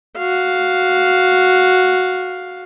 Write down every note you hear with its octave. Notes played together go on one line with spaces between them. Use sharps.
F#4 F5